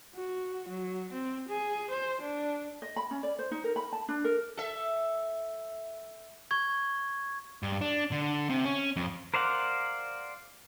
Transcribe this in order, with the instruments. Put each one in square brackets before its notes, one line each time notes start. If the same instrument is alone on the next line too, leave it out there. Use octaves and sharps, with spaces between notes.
[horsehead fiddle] F#4
F#3
C4
G#4
C5
D4
[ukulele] D#5
B5
C#4
D5
C5
D#4
A#4
B5
A5
D4
A#4
[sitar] A4 E5
[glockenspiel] C#6 G#6
[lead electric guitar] G2
D4
D3
C3
C#4
F2
[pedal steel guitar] A#4 C5 D5 F5 F#5